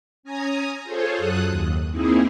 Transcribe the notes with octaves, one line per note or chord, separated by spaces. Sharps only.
C#4 G#5 A#5 D#6
F4 G#4 A4 C5 C#5
F#2 F#3 A4 D#6 F#6
D#2
A#3 C4 D#4 E4 G#4